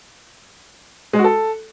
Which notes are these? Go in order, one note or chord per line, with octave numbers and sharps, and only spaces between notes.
G#3
F#4
A4